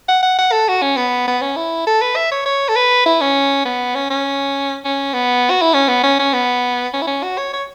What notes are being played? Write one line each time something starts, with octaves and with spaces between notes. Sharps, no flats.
F#5
F#5
F#5
A4
F#4
C#4
B3
B3
C#4
E4
A4
B4
E5
C#5
C#5
A4
B4
E4
C#4
B3
C#4
C#4
C#4
B3
F#4
E4
C#4
B3
C#4
C#4
B3
C#4
E4
C#4
F#4
C#5
C#5